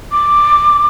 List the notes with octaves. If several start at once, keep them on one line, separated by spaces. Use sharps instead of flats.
D6